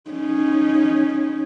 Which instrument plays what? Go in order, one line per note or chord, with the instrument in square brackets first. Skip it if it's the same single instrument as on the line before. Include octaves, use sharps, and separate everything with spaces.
[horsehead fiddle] C#4 D#4